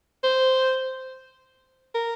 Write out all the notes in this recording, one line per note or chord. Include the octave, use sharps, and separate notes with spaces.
C5
A#4